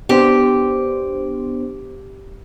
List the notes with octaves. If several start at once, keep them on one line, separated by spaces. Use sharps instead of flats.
B3 D4 G4 C5